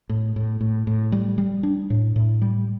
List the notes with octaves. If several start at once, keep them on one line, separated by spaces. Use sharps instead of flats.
A2
A2
A2
A2
G3
G3
D4
A2
A2
G3